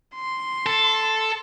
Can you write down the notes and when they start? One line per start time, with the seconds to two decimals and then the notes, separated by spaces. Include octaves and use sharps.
0.15 C6
0.66 A4